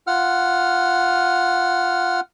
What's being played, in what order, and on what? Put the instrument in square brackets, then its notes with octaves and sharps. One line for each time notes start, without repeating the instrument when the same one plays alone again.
[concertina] F4 F#5 F6